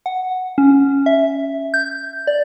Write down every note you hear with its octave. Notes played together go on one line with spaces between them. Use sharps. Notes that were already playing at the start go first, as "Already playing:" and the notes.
F#5
C#4
E5
G6
D5